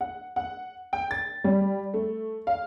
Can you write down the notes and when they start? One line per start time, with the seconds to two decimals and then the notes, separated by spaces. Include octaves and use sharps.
0.01 F#5
0.36 F#5
0.93 G5
1.11 A6
1.44 G3
1.94 A3
2.47 F5